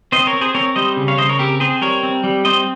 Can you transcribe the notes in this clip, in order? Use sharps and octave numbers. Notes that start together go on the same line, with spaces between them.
C4 C5 D#5
A#4 C#5
C4
G#4 C5
C4 A#4 C#5
G3 C5 D#5
C#3
C#5 F5
C#3 C5 D#5
A#4 C#5
C4 G4 A#4
C4 G#4 C5
G3 A#4 C#5
C4
G3
C4 C5 D#5